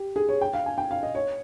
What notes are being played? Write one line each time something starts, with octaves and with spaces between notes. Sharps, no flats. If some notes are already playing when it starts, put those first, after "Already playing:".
Already playing: G4
G#4
C#5
G5
F5
G#5
G5
F5
D#5
C#5